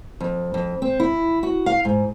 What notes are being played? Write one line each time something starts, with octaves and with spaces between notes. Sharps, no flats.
F2
F2
C4
E4
F#4
F5
G#2